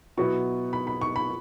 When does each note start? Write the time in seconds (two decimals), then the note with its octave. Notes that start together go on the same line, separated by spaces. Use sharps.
0.17 B2 F#3 B3 E4 C#6
0.73 B5
0.87 B5
1.01 C#6
1.16 B5